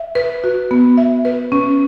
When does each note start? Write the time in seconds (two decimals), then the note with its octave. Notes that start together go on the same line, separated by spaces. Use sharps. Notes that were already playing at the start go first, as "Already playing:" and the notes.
Already playing: E5
0.15 B4
0.44 F#4
0.71 B3
0.97 E5
1.25 B4
1.52 C#4